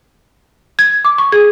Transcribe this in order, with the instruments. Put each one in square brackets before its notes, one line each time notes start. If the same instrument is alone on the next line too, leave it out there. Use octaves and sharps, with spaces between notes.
[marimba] G#6
D6
C#6
G#4